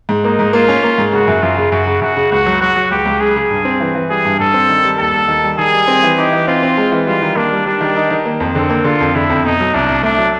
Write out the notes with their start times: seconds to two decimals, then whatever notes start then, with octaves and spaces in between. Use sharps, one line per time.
0.09 G#2
0.24 A#3 D#4
0.39 G#2
0.53 A#3 F4
0.68 C#4
0.83 A#3
0.98 G#2
1.12 C#3 F#4
1.28 F#2
1.43 F#2 F4
1.57 C#3
1.72 F#2 F#4
1.87 C#3
2.02 F#2 F#4
2.16 C#3
2.32 C#2 F#4
2.46 F#3
2.61 F#3 F#4
2.76 F#3
2.91 C#2 G4
3.05 C#2
3.20 C#3 G#4
3.36 C#3
3.51 G2
3.65 C4
3.80 E3
3.95 E3
4.10 G3 G#4
4.25 G2
4.39 G2 A4
4.54 C4
4.69 D#3
4.85 G3
4.99 D#2 A4
5.14 D#2
5.28 D#3
5.44 G3
5.58 D#3 G#4
5.74 G3
5.88 C4
6.03 E3
6.18 D#4 G4
6.33 E3
6.47 C4 F4
6.63 C4
6.78 G#3
6.92 E3
7.07 G3 F4
7.22 D#3
7.36 A#3 D4
7.52 G3
7.66 G3 D4
7.81 D#3
7.96 D#4
8.10 D#3
8.25 A#3
8.40 F2
8.55 D3 C4
8.70 A#3
8.84 D3 F4
9.00 F2
9.15 D3 E4
9.30 F2
9.44 B2 D#4
9.60 F#3
9.74 C2 D4
9.89 C2
10.03 A3 D4
10.18 F#3